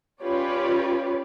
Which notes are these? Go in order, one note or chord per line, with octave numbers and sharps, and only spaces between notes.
C#4 F4 G4 B4 C#5 D5